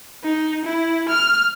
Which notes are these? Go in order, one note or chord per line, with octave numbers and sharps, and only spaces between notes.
D#4
E4
F6